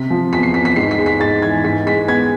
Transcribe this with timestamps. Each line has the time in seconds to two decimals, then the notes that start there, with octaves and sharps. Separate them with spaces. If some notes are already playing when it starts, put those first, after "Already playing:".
Already playing: C3 B6
0.10 F3
0.33 E2 B6
0.43 C7
0.54 E2 B6
0.65 B6
0.76 G#2 C7
0.91 B6
0.98 G#3
1.06 B6
1.20 G#2 A6
1.42 E3 G#6
1.64 G#2 B6
1.87 G#3 B6
2.08 B3 G#6